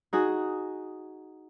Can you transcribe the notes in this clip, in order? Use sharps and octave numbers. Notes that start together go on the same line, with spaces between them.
D#4 F#4 G#4